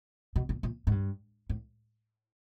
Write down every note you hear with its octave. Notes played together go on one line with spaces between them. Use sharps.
B2
A#2
A#2
G#2
G2
A2